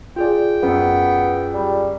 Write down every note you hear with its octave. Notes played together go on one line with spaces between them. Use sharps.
F4 G#4 D5 G5
F#2 B3
G3